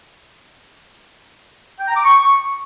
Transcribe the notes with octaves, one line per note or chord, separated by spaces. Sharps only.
G5
A#5
D6
C#6